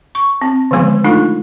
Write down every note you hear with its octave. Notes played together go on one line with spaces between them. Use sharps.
C#6
C4
D3 D#3 F3 G#3 B3 D6
A3 D4 D#4 F4 A4